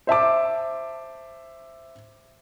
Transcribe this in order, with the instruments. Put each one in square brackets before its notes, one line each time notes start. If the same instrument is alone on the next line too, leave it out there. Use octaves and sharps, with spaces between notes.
[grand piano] C5 E5 A5 D6